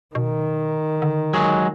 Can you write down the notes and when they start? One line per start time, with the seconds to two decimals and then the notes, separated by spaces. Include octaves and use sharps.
0.15 B2 D#3
1.02 D3
1.34 F#3 G#3 G#4